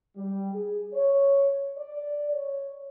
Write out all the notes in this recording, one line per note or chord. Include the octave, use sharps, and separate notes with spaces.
G3
G#4
C#5
D5
C#5